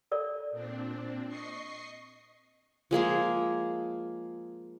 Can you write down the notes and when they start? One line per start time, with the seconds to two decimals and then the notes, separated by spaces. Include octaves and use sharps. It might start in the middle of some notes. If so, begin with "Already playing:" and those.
0.12 A4 A#4 D5
0.51 A#2 C4 D4
1.28 D#5 C#6 C7
2.91 F3 G#3 A#3 G#4